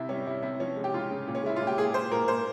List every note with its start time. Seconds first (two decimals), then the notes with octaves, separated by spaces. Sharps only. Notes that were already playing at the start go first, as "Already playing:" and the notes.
Already playing: C3 E4
0.09 G3 C#4
0.27 G3 E4
0.42 C3 E4
0.59 F3 C#4
0.77 G#3
0.84 G4
0.94 C#3 F4
1.11 C#3
1.28 A#2
1.35 C#4
1.44 G#3 E4
1.56 F4
1.61 A#2
1.67 G4
1.78 A#2 G#4
1.94 A#2 C5
2.11 A#2 A#4
2.28 A#2 C5